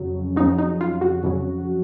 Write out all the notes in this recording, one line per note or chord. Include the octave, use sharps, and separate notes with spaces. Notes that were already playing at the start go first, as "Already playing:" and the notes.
Already playing: F2 C#3 F#3
F2 C#3 F#3 D#4
D#4
F4
F#4
F2 C#3 F#3